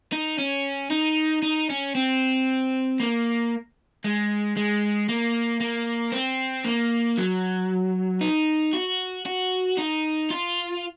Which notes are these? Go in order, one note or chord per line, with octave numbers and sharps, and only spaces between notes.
D#4
C#4
D#4
D#4
C#4
C4
A#3
G#3
G#3
A#3
A#3
C4
A#3
F#3
D#4
F#4
F#4
D#4
F4